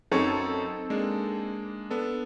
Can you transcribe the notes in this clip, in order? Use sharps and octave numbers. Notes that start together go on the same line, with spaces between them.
F#2 C4 D#4 A4 C#5 C#6
G#3 A#3 D4
B3 D4 A4